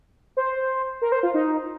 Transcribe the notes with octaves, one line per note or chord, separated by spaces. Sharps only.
C5
A#4
C5
F4
D#4